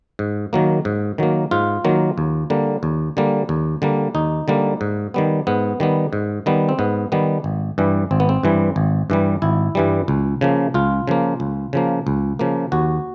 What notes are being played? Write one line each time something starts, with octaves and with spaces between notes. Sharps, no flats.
G#2
D#3 F#3 A#3
G#2
D#3 F#3 A#3
G#2 F4
D#3 F#3 A#3
D#2
D3 G3 A#3
D#2
D3 G3 A#3
D#2
D3 G3 A#3
D#2 D#4
D3 G3 A#3
G#2
D#3 G3 B3
G#2 B3
D#3 G3 B3
G#2
D#3 G3 B3
C4
G#2 B3
D#3 G3 B3
G#1
G2 E3 G3
G#1 C4
B3
C4
G2 E3 G3
G#1
G2 E3 G3
G#1 E4
G2 E3 G3
C#2
C#3 F3 A#3
C#2 F4
C#3 F3 A#3
C#2
C#3 F3 A#3
C#2
C#3 F3 A#3
D#2 F#4